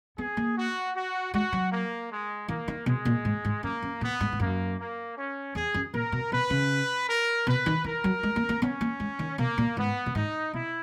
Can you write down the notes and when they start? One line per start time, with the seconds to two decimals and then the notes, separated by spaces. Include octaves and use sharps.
0.18 B3 G#4
0.37 A#3
0.56 F#4
0.95 F#4
1.34 G#3 F#4
1.52 F#3
1.71 A#3
2.10 G#3
2.48 E3 A#3
2.68 D#3
2.86 B2 G#3
3.05 A#2
3.25 G#2
3.45 G#2
3.63 F#2 A#3
3.82 F#2
4.01 A#2 B3
4.20 G#2
4.32 G#2
4.40 F#2 A#3
4.78 A#3
5.17 C#4
5.55 E2 G#4
5.74 F#2
5.93 A#2 A#4
6.12 B2
6.31 B2 B4
6.50 C#3
7.08 A#4
7.47 B2 B4
7.66 D#3
7.84 E3 A#4
8.04 F#3
8.23 G#3
8.36 A#3
8.49 A#3
8.62 B3 C#4
8.81 A#3
9.00 G#3
9.19 D#3
9.38 B2 A#3
9.58 A#2
9.77 G#2 B3
10.06 A#2
10.15 G#2 D#4
10.53 B2 E4